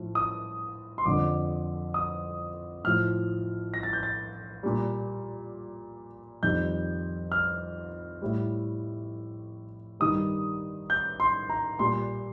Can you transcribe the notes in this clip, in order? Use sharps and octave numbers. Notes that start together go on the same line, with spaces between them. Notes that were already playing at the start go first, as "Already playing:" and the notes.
Already playing: A2 F3
D#6
C6
F2 D3 F3 D6
D#6
A2 F3 F6
A#6
A6
G6
A6
A#2 G3
F2 D#3 G3 G6
F6
A2 G3
G2 D#3 G3 D#6
G6
C6
A#5
A#2 G3 C6